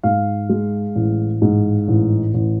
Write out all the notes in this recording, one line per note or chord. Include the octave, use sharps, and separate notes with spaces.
G#2 F5
G#3
A1
G#2
A1
A1